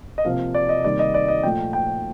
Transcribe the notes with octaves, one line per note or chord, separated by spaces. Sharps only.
D#5
C3 F3 A#3 F5
D5
D#5
C3 D#3 G3 A#3 D5
D#5
D5
D#5
A#2 F3 A3 G5
G5